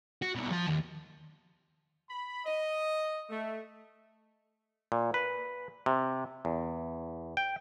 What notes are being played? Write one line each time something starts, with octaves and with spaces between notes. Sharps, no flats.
F#4
C2 B2
F3 A5
D#2
B5
D#5
A3
A#2
B4
C3
E2
G5